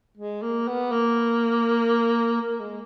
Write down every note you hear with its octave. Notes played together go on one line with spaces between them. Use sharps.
G#3
A#3
B3
A#3
A#3
G#3